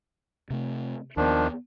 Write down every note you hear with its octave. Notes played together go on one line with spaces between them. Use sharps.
C3 A3
D#2 D#3 F3 B3 D4